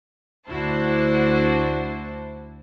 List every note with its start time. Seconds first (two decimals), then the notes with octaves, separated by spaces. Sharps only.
0.47 D2 D4 E4 F#4 C5 A5